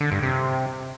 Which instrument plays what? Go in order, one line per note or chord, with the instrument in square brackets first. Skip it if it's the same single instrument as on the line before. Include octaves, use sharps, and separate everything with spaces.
[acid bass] D3
G2
C3